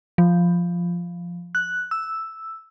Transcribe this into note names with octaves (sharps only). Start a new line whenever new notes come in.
F3
F#6
E6